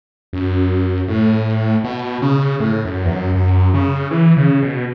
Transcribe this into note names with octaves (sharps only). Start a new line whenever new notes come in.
F#2
A2
B2
C#3
A2
F#2
E2
F#2
F#2
C#3
E3
C#3
B2